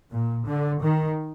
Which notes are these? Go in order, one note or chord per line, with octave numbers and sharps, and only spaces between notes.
A#2
D3
D#3